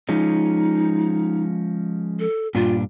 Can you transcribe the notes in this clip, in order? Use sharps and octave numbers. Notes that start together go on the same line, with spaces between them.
F3 G#3 C#4 D#4
A4
G2 A#2 D4 F4